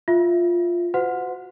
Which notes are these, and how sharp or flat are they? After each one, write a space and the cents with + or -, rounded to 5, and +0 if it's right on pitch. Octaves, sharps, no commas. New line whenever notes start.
F4 +0 E5 +0
F#4 +0 C5 -45 F#5 -25